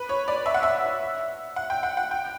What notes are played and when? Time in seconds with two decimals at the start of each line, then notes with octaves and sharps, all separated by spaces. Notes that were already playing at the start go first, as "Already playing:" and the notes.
Already playing: B4
0.09 C#5
0.28 D5
0.46 E5
0.54 F#5
0.63 E5
1.56 F#5
1.70 G5
1.83 F#5
1.97 F#5
2.11 G5